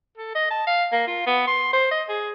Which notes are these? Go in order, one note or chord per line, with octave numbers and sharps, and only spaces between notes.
A4
D#5
A5
F5
A#3
F4
B3
C6
C5
D#5
G#4